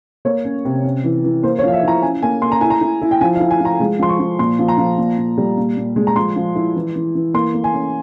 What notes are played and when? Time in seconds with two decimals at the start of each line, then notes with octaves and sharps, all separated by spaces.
0.25 A#3 C#5
0.45 C#4
0.65 C3
0.84 C#4
1.04 E3
1.24 E3
1.43 A#3 C5
1.59 C#5
1.63 F3 F5
1.73 E5
1.83 E4 A#5
2.02 C#4 G#5
2.22 A#3 G#5
2.42 A#3 C6
2.52 A#5
2.61 E4 G#5
2.70 A#5
2.81 E4
3.02 E4
3.11 G5
3.21 F3 G#5
3.36 F5
3.40 E4
3.51 G#5
3.60 F3 A#5
3.80 G#3
3.99 F3 C6
4.09 C#6
4.19 F3
4.39 A#2 C6
4.59 F3
4.68 A#5
4.78 F3
4.98 A#2
5.18 A#2
5.38 G3
5.57 A#2
5.77 A#2
5.96 G#3
6.07 A#5
6.16 F3 C6
6.36 F3
6.55 E4
6.76 E3
6.96 E3
7.15 E3
7.34 A#3 C6
7.54 A#3
7.64 G#5
7.74 C#4